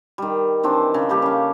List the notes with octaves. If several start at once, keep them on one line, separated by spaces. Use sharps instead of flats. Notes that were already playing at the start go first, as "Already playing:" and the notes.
D#3 G3
D#3 E3 C4 D4
C#3
G3 A#3 G4 A4
C#3 F5